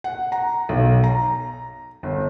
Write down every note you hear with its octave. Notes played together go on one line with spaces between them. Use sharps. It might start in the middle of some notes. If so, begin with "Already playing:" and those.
F#5
A#5
B1
A#5
G1